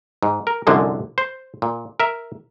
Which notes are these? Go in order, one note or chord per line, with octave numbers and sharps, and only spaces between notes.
G#2
A#4
C2 F#2 D3 F3 G#3
C5
A#2
A#4 E5